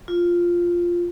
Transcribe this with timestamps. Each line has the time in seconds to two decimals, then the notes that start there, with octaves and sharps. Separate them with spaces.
0.08 F4